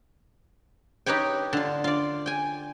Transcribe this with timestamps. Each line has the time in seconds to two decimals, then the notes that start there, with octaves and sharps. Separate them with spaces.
1.06 D#4 G4 B4 C#5 G5
1.53 D3 F4
1.84 F4 D5
2.26 G5 G#5